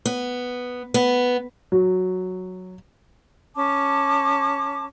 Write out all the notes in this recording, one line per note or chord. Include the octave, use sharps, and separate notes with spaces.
B3
B3
F#3
C#4 A5 D6